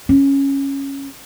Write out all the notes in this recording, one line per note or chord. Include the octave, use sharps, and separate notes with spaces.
C#4